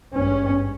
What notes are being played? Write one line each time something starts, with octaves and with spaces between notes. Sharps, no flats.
G#1 G2 C#4